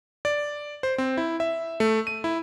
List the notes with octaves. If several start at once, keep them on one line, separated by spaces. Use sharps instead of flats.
D5
C5
C4
E4
E5
A3
D#7
E4